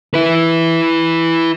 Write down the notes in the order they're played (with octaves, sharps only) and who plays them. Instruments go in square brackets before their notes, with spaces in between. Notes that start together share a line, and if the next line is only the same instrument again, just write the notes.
[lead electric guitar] E4 B4